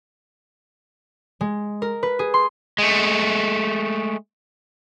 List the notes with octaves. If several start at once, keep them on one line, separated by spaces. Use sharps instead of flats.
G#3
A#4
B4
G#4
C6
G#3 A3